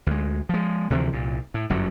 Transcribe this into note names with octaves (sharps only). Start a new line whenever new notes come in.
D2 G#3
F3 G#3
D2 C3 E3 F3
C2 A#2
A2
G1 F#2 D3 F#3